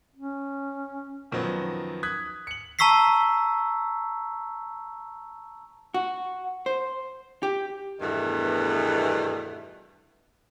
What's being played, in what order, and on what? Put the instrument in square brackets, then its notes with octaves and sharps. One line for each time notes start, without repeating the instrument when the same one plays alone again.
[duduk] C#4
[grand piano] F#2 D#3 F3 F#3 B3
D#6 F#6 G#6 B6
C#7 F#7
[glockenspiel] A5 A#5 C#6 E6 B6 C7
[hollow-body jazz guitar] F#4
C5
G4
[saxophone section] E2 G2 B2 D#3 A3